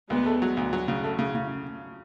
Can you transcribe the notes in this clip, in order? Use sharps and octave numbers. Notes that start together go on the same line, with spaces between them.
D2 G#3 B3
A3
F#3
D2
F#3
C#3
A3
C#3
C#3